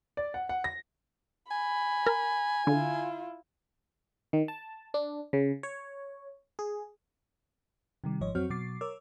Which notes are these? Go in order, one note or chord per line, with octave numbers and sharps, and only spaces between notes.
D5
F#5
F#5
A#6
G#5 B5
A#4
D3 E4 F4
D#3
A5
D4
C#3
C#5
G#4
C3 D#3 G3
G#1 G#2 F3 C#5 D#5
F2 F#3 C4 F#4 C#5 F6
B2 F#3 D6 A6 C7
A#4 C#5 D6 E6